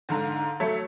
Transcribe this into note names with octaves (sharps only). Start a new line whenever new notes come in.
G#2 D3 F5 A#5
F#3 A3 A4 C#5